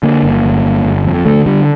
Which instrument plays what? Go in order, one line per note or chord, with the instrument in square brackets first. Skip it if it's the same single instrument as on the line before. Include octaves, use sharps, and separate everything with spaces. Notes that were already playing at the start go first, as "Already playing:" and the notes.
[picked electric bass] D3 A#3
G1
G1
G1
G1
F2
D3 A3
D3 G3